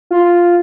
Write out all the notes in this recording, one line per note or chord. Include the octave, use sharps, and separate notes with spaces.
F4